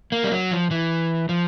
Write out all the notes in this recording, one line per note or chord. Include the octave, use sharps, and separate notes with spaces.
A#3
G3
F#3
F3
E3
F3